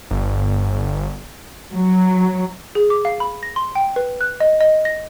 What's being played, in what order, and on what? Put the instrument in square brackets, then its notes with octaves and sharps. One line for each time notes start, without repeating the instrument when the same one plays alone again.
[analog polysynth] G1
[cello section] F#3
[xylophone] G#4
D6
F5
B5
A#6
C6
G5
B4
F#6
D#5
D#5
A#6